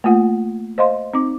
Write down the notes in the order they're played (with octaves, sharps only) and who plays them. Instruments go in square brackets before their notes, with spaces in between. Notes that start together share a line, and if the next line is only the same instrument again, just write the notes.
[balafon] A3 A#3 F4 F#5
C5 D#5 F5 C6
C4 D#4 D6